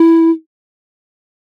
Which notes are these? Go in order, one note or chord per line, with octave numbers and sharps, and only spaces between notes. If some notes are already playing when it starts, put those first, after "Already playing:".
Already playing: E4